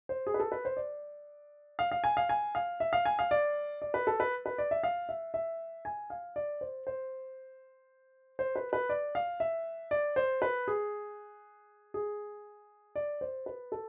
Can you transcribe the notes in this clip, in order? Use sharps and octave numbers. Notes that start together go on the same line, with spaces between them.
C5
G#4
B4
A4
B4
C5
D5
F5
F5
G#5
F5
G#5
F5
E5
F5
G#5
F5
D5
D5
B4
A4
B4
B4
D5
E5
F5
E5
E5
G#5
F5
D5
C5
C5
C5
B4
B4
D5
F5
E5
D5
C5
B4
G#4
G#4
D5
C5
B4
A4